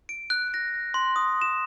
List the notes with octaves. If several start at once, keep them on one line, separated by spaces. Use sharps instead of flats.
D7
F#6
A#6
C6
D#6
E7